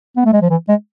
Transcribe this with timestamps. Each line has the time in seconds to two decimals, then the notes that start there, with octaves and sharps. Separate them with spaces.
0.17 B3
0.25 A3
0.33 G#3
0.42 F3
0.50 E3
0.69 G#3